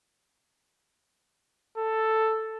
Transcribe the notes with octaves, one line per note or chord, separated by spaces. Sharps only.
A4